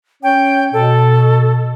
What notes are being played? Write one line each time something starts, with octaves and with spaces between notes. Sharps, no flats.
C#4 C#5 G5
B2 A4